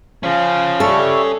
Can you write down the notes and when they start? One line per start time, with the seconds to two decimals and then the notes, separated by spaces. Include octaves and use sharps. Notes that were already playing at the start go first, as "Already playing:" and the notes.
0.23 F3 C#4 G#4
0.80 G3 A4 C#5 E5